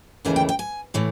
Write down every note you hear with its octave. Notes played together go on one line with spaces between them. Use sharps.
D#2 C#3 E3 A3 G#5
G5
G5
G#5
A2 E3 A3